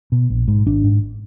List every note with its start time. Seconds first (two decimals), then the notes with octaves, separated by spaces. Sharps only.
0.12 B2
0.30 A#1
0.48 G#2
0.66 G#1 D4
0.84 G#2